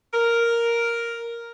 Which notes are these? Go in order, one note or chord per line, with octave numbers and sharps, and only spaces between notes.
A#4